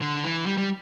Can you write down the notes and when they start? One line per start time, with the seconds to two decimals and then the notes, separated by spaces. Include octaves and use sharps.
0.01 D3
0.23 E3
0.46 G3
0.58 G3